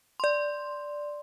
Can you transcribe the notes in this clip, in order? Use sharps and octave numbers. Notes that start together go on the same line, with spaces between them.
D5 C6